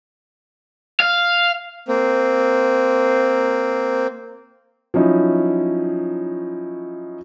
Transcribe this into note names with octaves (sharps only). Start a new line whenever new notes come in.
F5
A#3 C4
F3 F#3 C#4 D#4 E4